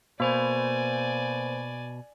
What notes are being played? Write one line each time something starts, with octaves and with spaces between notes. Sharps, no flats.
B2 A#3 C5 D5 G#5